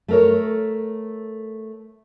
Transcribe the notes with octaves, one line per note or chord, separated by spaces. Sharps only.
A3 A#4 C#5